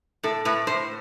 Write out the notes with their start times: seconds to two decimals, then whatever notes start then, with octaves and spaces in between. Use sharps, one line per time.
0.23 A2 A4
0.45 A2 B4
0.67 A2 C5